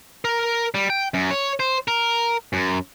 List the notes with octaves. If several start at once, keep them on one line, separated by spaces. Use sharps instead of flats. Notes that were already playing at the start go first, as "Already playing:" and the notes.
A#4
G3
G5
F#2
C#5
C5
A#4
F#2